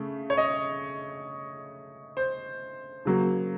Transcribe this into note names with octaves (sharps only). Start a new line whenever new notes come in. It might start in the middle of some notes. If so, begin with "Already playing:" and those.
Already playing: C#3 A3
C#5
D#5
C5
C#3 F#3 A#3